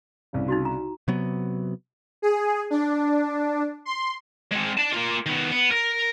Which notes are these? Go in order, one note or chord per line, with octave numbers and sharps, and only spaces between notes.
C2 C#3
D#4 E4 F#4
A#5
C3 F#3 B3
G#4
D4
C6
G#3 C4
D5 A5
A#3 F4
D#3 B3
B3
A#4